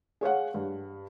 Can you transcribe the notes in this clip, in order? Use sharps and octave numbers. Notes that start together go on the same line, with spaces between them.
G#4 C#5 F5 F#5
G2